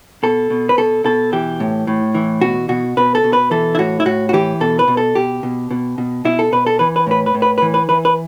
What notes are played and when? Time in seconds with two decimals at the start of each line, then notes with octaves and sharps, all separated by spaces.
0.23 B2 A4
0.50 B2
0.69 B4
0.77 B2 A4
1.04 B2 A4
1.32 E3 G4
1.60 A2
1.87 A2
2.15 E3
2.41 B2 F#4
2.69 B2 F#4
2.97 B2 B4
3.15 A4
3.24 B2
3.33 B4
3.51 E3 A4
3.75 E4
3.79 A2 F#4
4.00 E4
4.06 A2 F#4
4.29 F#4
4.33 E3 G4
4.60 B2 A4
4.79 B4
4.88 B2
4.97 A4
5.15 B2 G4
5.43 B2
5.71 B2
5.98 B2
6.25 B2 E4
6.39 A4
6.52 B2 B4
6.66 A4
6.79 E3 B4
6.96 B4
7.07 A2 B4
7.26 B4
7.34 A2
7.42 B4
7.58 B4
7.62 E3
7.74 B4
7.89 E3 B4
8.05 B4